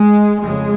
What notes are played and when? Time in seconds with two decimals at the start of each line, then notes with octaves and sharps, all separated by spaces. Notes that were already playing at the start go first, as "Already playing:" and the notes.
Already playing: G#3
0.41 F2 C#3 G#3